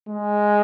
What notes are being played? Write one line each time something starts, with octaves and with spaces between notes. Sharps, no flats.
G#3